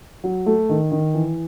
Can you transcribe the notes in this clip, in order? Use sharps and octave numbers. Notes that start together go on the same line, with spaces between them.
F#3
A3
D#3
D#3
E3